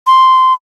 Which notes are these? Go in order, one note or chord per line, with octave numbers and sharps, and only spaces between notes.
C6